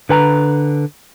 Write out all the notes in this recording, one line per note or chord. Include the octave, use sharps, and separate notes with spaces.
D3 B4 G#5 A#5